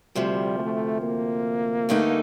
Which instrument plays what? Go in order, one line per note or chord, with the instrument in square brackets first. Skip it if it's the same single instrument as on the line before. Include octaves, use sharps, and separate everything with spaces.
[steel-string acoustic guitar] D2 C3 F3 [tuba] G3
[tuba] A3
A#3
[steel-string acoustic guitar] G2 D3 A3 D#4